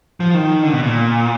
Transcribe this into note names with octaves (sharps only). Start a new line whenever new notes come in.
F3
D#3
D3
B2
A#2